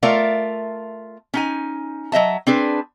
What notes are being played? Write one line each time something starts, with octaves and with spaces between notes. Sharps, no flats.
A3 F4 A#4 D5 E5 F5
C#4 D#4 G#5
F#3 D#5 E5 A5
C4 D4 G#4 B4